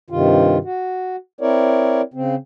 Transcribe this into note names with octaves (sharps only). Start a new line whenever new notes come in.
G2 C3 D#3 F4
F#4
C4 E4 A#4 C#5 D5
C#3 C4